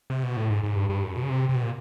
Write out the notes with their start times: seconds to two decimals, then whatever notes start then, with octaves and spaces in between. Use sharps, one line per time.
0.10 C3
0.23 B2
0.37 A2
0.50 G#2
0.63 G#2
0.76 G2
0.90 G2
1.03 F#2
1.16 B2
1.23 C#3
1.30 C3
1.49 C3
1.55 B2
1.63 A#2